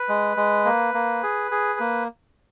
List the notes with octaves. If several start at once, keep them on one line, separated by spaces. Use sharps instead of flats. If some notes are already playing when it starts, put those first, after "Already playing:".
Already playing: B4
G#3
G#3
A#3
A#3
G#4
G#4
A#3